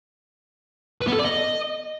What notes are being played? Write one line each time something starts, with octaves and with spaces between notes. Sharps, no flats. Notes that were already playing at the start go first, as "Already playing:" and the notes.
B4
B3
A4
D5
D#5